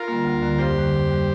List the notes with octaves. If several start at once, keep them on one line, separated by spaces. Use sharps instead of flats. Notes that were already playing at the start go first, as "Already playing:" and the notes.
Already playing: F4 A#4
D3 G3 A#3
D2
D3 G3 A#3
F2 G4 C5
D3 G3
F2
D3 G3